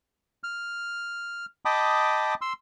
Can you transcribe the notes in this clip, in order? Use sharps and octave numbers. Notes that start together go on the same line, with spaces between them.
F6
D#5 G5 A5 B5 D6 D#6
C6 E6